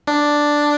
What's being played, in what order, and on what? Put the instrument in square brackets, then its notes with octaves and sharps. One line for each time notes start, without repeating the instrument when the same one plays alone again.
[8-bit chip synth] D4